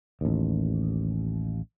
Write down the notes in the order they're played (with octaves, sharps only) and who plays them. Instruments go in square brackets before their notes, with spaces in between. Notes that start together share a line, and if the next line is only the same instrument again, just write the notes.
[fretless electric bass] A1 D#2